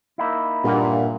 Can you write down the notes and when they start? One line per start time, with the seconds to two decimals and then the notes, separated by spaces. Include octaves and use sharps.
0.18 A#3 D#4 E4
0.64 G2 A#2 F#5